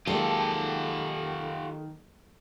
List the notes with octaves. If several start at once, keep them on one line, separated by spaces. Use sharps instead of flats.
D#3 F#3 G#3 A#3 F4 G4 A4